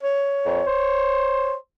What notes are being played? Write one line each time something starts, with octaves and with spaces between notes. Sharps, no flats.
C#5
F2
C5